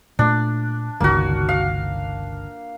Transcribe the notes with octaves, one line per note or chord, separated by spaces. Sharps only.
A#2 A3 D4
G1 C#2 D#3 A#3 F#4
F5